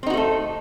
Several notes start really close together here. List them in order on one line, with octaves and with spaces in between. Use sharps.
C4 D#4 F#4 A3 A4